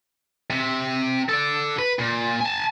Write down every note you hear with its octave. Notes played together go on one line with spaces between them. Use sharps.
C3
A4 D5
B4
A#2
G#5 A5